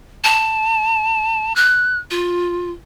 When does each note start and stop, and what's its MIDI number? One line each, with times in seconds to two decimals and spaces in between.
0.24 1.53 81
1.56 1.98 90
2.11 2.71 65